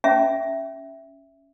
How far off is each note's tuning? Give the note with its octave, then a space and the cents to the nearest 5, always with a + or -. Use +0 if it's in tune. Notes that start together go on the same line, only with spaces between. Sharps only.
C#4 +5 E5 +0